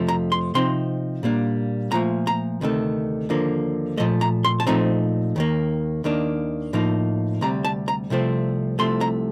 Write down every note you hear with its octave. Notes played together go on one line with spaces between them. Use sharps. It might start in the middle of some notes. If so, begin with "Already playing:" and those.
Already playing: F2 C3 F3 A3
A#5
C6
C3 F3 C4 D#4 C6
A#2 G3 A#3 D4
A#2 F3 A3 A#5
A#5
D2 C3 D#3 A3
D#2 D3 F3 A#3
A#2 F3 A3 D#5
A#5
C6
A5
A#2 F3 A3 C4 D#4 A#5
D#2 D#3 A#3
D#2 D#3 A#3 D4
A2 F3 A#3 D#4
D2 C3 G3 A#5
A5
A#5
C2 C3 F3 A3 C4
C2 C3 F3 A3 C6
A#5